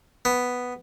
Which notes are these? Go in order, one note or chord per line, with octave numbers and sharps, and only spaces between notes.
B3